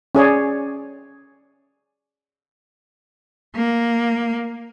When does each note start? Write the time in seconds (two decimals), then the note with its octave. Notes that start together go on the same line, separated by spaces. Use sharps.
0.15 C#4 G#4 C#5 D5
3.55 A#3